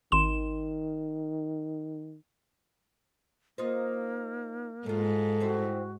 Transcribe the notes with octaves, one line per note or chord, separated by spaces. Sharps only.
G#1 D#3 C6 E7
A#3 D#4 F4 C5
G#2 F#3 F4 A4
G3 C4 E4 F#4